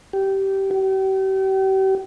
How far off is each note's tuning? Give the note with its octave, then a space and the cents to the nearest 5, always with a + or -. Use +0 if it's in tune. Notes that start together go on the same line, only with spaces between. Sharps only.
G4 -15
G4 -40